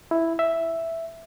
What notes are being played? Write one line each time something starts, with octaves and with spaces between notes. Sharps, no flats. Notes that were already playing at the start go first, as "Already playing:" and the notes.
E4
E5